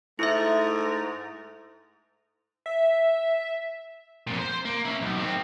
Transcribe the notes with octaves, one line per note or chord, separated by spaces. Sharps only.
G#2 A3 E4 E5
E5
F2 A#2
C5
A#3
C#4 E4
B1
D#3 C4